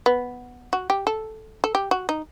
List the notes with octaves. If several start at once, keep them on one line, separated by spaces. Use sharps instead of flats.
B3
F#4
G4
A4
A4
G4
F#4
D#4